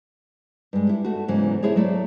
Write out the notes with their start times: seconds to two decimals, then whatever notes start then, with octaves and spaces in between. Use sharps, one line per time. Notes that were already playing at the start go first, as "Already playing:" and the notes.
0.73 G2 G#3
0.87 G3 E4
1.04 A3 F#4
1.28 E2 G#2 C#3 E3 F#3
1.63 B3 D4 E4 G#4 C5 C#5
1.76 F#3 A3 D5